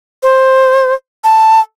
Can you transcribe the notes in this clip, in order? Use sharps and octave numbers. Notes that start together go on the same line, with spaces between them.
C5
A5